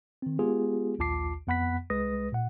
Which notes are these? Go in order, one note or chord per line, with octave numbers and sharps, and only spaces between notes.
D#3 C4
G#3 B3 F4 G4 G#4
A#1 D#2 F4 A5 D6 C7
F2 B3 F#5 B5 F#6 B6
C2 G#3 B4 D#6 A#6
A#2 F#5